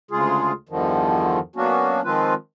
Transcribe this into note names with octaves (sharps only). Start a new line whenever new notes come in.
D2 C#3 G#3 F4 G#4
E2 G2 D3 D#3 F3
F#3 A#3 B3 C#4 D4 F#4
D#3 F3 G#3 C4 F4 B4